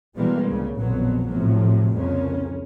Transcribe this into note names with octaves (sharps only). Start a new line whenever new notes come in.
B2 E3 G3 G#3 A#3
C2 C#3
A#1 F2 B2 D3 F#3 B3
A2 C3 F3 F#3
C2 F2 C#3 A#3 C#4